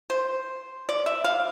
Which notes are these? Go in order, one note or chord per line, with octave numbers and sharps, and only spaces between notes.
C5
D5
E5
F5